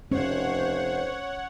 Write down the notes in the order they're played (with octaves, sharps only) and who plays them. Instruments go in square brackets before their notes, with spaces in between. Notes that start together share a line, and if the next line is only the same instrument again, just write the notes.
[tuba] F1 [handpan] C#4 [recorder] C5 [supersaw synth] C#5 F#5